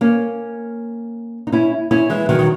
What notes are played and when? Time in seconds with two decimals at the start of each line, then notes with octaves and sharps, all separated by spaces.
0.01 A#3 C#4
1.47 D#4
1.52 C#4 E4
1.91 C#4 E4
2.09 E3 G#3
2.29 D#3 F#3
2.39 D#3